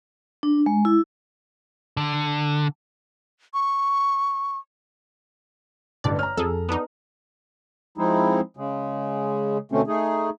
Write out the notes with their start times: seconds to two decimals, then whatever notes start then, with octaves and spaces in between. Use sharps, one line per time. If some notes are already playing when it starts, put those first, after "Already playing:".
0.43 D4
0.66 G#3
0.85 E4
1.97 D3
3.54 C#6
6.04 A1 G2 D3 D5
6.19 C#4 A#5 F6
6.37 F2 G#4 A4
6.69 B3 D4 D#4
7.98 F3 G#3 C4 D#4 E4
8.57 C#3 G#3
9.72 B2 D3 A3 C4 C#4
9.87 A3 D#4 G#4